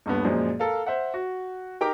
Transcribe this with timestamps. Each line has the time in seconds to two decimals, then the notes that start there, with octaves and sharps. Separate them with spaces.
0.06 D#1 G2 B3
0.24 F#2 A#2 F3 G#3
0.59 A4 A#4 F5
0.86 C5 E5 F#5
1.14 F#4
1.81 D#4 G4 A#4 G5 A#5 D6